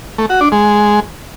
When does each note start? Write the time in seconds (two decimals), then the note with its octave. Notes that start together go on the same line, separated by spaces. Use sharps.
0.18 A3
0.30 F#4
0.41 D4
0.52 G#3